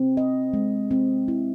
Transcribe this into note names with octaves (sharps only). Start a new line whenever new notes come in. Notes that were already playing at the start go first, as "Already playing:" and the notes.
Already playing: C4
D#5
G#3
C4
E4